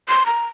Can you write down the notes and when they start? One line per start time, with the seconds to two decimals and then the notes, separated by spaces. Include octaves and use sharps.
0.08 C6
0.26 A#5